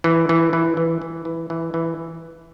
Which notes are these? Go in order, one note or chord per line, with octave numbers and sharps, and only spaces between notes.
E3
E3
E3
E3
E3
E3
E3
E3